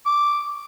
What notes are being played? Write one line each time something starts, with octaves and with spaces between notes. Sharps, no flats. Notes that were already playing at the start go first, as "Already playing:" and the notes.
D6